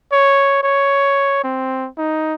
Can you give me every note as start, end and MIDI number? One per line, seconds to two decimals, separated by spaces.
0.12 0.59 73
0.63 1.44 73
1.44 1.89 60
1.98 2.34 63